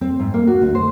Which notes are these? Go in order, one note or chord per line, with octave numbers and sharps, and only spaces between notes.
C4
G#2
A#3
F#4
D2
C5